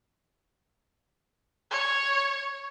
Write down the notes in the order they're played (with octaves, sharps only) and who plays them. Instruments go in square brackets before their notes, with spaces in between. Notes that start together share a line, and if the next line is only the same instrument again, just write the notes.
[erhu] C#5